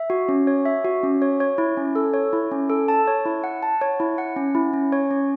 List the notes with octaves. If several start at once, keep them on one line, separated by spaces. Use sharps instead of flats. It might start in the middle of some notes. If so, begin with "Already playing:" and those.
Already playing: E5
F#4
C#4
C#5
E5
F#4
C#4
C#5
C#5
E4
C#4
A4
C#5
E4
C#4
A4
A5
C#5
E4
F#5
A5
C#5
E4
F#5
C#4
E4
C#4
C#5
C#4